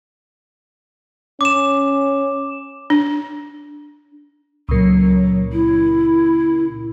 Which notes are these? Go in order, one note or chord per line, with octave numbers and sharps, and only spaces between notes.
C#4 D6 E7
D4
C#2 A#2 F#3
E4